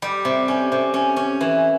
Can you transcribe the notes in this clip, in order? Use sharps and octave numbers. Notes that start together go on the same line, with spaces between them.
G3
C3
C#4
C3
C#4
C#4
E3